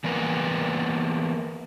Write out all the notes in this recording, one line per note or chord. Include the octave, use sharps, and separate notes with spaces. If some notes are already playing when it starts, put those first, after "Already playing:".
E3 A#3 B3 A#4 B4